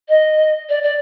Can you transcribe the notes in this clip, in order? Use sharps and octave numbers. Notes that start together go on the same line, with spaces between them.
D#5
D5
D5